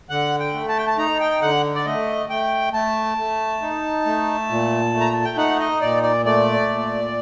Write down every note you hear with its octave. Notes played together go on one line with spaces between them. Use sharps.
D3 F#5
G5
A3
A5
G5
A5
D#4 A#5
G5
D3 F#5
D5
A3 D#5
A3 G5
A3 A5
A3
D#4
A3
A#2
A3
A#5
A5
G5
D#4 F#5
D#5
A#2 D5
D5
A3 D5
A#2